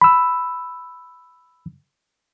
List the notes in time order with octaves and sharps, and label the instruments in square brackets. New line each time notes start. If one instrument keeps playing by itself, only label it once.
[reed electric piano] B5 E6